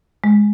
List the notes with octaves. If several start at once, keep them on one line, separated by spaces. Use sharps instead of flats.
G#3